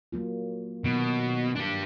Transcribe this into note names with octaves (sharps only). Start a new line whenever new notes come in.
F#3 A#3 F4
B2 D#3 F#3
D4 G4